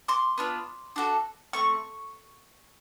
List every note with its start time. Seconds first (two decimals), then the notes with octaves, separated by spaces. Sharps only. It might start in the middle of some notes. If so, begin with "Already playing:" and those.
0.08 C6 D6
0.38 B3 D4 F4
0.96 D4 F#4 A4
1.53 A3 C4 C#6